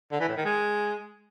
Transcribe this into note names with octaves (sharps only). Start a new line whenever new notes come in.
D3
E3
A2
D#3
G#3